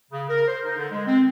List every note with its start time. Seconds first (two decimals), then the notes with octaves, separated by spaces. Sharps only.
0.11 C#3
0.29 A#4
0.48 C5
0.64 D#4
0.77 D3
0.92 G#3
1.06 C4